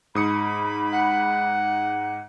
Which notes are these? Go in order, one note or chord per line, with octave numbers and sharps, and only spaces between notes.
G#2 B5 D#6 C#7
F#5